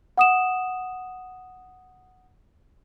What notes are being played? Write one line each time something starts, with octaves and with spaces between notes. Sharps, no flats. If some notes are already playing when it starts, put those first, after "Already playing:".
F#5 D#6 E7